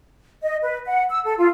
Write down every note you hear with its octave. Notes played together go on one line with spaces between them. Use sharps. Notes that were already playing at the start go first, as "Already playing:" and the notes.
D#5
B4
F#5
E6
A4
F4